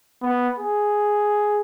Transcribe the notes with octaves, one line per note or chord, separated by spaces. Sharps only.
B3
G#4